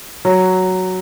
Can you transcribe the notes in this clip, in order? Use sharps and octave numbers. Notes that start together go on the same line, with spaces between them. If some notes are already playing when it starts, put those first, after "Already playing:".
F#3